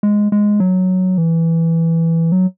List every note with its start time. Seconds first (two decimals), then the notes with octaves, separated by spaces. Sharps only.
0.03 G#3
0.32 G#3
0.60 F#3
1.18 E3
2.32 F#3